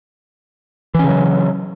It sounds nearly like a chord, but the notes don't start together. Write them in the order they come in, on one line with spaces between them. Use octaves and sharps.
E3 C#4 C#3 F#3